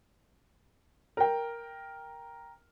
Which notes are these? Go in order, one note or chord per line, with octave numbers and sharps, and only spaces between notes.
A#4 G5